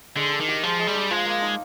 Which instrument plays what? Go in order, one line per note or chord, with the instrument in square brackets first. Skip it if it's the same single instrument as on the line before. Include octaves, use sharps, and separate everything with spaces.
[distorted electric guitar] D3 [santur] G#3
[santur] D4
[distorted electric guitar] D#3
[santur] G4
[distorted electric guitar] F3 [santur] G#3
[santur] G#3
[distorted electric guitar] G3
[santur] D4
[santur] F3 [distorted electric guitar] G#3
[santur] A#3
D#4